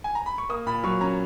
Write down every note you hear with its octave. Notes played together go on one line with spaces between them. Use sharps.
G#5
A#5
B5
C#6
A#3 D#6
A#2 B5
F#3 C#6
C#4 A#5